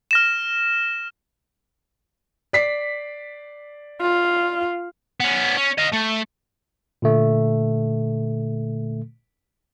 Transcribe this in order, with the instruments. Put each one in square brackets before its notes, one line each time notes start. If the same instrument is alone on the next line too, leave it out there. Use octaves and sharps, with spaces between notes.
[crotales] F6 A#6 E7
[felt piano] D5 B6 C7
[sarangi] F4
[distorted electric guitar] B3 C#4
C#4
D#5 F5
A3
[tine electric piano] A#2 D3 A3